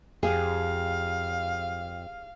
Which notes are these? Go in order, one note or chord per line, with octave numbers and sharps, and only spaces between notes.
F2 G4 G#4 F5